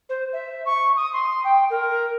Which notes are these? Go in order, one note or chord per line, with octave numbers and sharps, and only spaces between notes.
C5
E5
C#6
D#6
C6
G5
A#4